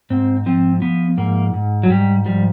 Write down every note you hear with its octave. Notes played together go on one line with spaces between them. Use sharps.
G#2 C4
F3 C4
F3 B3
G#2 A#3
G#2
F#3
G#2 G3
F3 G3